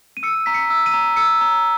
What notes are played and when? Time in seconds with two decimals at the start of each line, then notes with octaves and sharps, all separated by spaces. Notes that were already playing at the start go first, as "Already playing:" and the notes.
0.17 D#7
0.23 E6 C#7
0.46 A#5 B6
0.54 C#7
0.70 E6
0.86 D#7
0.94 A#5
1.16 E6 C#7
1.41 A#5